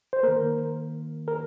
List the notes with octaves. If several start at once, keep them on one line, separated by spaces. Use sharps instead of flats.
C5
D#3 A#3 A#4
A#4